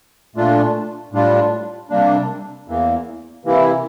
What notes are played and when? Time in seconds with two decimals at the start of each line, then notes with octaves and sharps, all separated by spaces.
0.35 A#2 A3 D4 F4
1.12 A2 G3 D4 F4
1.90 C3 G3 A#3 D4
2.68 E2 E3 A#3
3.45 C3 E3 A#3 E4